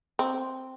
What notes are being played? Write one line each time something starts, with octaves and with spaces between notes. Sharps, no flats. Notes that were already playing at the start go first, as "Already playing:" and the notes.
C4